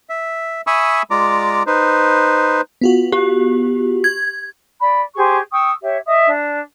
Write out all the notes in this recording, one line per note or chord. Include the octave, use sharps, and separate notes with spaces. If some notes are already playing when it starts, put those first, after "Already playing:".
E5
E5 G#5 B5 C#6 D#6 E6
G#3 F4 D5 A#5 D6
D#4 B4 C5
B3 F4 F#4
G4
G#6
D5 B5
G4 G#4 C5 C#6
G5 C#6 D#6 E6
G4 C#5 E5
D#5 E5 D#6
D4